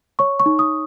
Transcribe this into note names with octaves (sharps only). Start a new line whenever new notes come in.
C#5 C#6
C#6
D#4
D#6